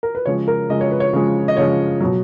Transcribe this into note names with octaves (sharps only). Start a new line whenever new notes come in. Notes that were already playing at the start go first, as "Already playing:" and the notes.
A#4
B4
C#3 F3 G#3 C#5
A#4
C#3 F3 G#3 D#5
C#5
B4
C#5
C#3 F3 G#3
D#5
C#3 F3 G#3 C#5
B2 F#3